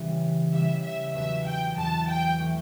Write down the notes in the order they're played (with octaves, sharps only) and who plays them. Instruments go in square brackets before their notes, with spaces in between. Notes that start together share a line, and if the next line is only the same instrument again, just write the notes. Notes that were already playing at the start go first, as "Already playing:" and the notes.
Already playing: [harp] C#3 E3 G3
[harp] C#3 E3 G3 [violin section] E5
[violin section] E5
[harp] E2 B2 F#3 [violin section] E5
[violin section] G5
[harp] E2 B2 F#3 [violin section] A5
[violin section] G5
[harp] E3 A3